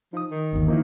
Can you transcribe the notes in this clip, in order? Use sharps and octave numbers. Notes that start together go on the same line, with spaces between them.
F3 D#4 D#6
D#3
G1 D#2
D#3 F3 A#3 D#4 E4